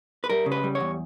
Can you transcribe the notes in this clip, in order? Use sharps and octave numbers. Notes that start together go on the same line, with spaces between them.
B4
G3 A#4
C#3
B4
G3
C#5
E2